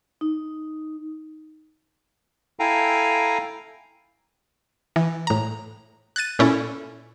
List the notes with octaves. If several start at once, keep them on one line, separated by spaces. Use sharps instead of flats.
D#4
E4 A4 F5 G5 G#5 A#5
E3
A2 A#5
F#6 G#6 A6 D#7
A#2 C#4 E4 A4